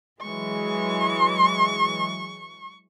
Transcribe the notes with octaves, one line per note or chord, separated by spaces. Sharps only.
E3 F#3 G#3 C#6